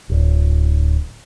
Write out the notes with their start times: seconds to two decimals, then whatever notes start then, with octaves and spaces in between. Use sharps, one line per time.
0.09 D1